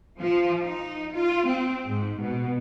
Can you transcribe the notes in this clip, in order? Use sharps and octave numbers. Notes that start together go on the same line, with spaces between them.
F3
D#4
F4
C4
G#2
B2